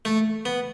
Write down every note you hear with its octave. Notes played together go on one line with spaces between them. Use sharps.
A3
B3